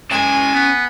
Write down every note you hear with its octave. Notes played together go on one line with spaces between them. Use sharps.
G#3 C#4 G#5 A5
B3